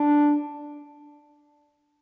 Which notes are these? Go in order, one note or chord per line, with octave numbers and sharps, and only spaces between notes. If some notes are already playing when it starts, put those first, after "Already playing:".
Already playing: D4